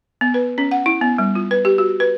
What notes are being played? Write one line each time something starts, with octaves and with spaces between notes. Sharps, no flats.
B3
B4
C#4
F#5
E4
B3
G3
F4
B4
G4
F#4
B4